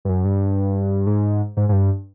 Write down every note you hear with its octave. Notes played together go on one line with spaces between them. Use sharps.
G2
F#2
G2
G#2
G#2
G#2
G2